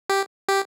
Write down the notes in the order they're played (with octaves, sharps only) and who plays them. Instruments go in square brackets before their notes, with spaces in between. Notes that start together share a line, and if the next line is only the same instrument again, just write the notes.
[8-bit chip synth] G4
G4